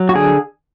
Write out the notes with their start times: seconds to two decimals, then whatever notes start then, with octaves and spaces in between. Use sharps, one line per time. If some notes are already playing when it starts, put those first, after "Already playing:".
Already playing: F#3
0.09 F#4
0.15 D3 G#4